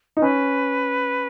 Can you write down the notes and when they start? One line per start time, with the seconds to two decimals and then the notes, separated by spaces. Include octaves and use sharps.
0.17 D#4
0.21 C#4 B4